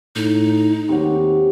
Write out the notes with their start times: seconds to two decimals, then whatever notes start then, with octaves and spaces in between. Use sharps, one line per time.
0.16 A2 D#4
0.89 D#2 C3 F#3